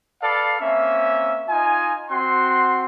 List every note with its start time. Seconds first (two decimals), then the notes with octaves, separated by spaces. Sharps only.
0.22 A4 B4 D5 F5 A5
0.60 A#3 C4 C#4 E5
1.49 D#4 F4 G#5
2.09 C4 F#4 F#5 C6